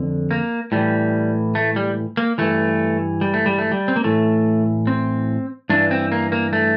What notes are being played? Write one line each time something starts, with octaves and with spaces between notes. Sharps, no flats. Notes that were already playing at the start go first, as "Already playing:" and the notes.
Already playing: F2 D3
A#3
A2 E3 G3
A3
G3
A#3
G2 E3 A3
G3
A3
G3
A3
G3
C4
A#3
A2 E3 A3
C4
G2 E3 D4
C4
A#3
A#3
A3